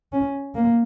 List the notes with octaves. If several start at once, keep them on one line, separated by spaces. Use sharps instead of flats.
C#4
A#3